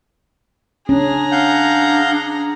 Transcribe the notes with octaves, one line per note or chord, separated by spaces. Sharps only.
C#4 D4 G#4 A#5
F5 F#5 G6